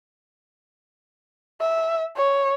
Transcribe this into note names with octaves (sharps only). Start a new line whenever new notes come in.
E5
C#5